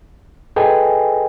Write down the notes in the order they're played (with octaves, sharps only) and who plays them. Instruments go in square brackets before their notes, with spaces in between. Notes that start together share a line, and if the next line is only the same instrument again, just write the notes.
[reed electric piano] G#4 A4 B4 D#5 G5 G#5